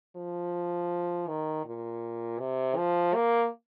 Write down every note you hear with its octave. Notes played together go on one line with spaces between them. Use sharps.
F3
D#3
A#2
C3
F3
A#3